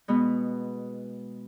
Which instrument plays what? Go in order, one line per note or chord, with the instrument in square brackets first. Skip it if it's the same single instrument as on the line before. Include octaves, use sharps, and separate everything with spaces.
[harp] B2 G#3 B3